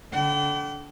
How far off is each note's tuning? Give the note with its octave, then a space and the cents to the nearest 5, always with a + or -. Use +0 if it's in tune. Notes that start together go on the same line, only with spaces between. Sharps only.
D3 -25 G5 -40